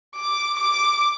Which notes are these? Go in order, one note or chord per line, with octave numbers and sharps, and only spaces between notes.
D6
D6